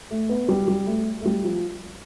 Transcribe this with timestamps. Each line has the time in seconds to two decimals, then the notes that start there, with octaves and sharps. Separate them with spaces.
0.11 A3
0.29 B3
0.48 G3
0.68 G3
0.87 A3
1.21 A3
1.25 G3
1.44 F3